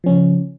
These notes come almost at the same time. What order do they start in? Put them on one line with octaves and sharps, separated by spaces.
F3 C#4 C#3